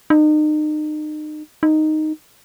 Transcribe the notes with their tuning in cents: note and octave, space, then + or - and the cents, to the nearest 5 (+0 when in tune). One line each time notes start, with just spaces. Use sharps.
D#4 -35
D#4 -5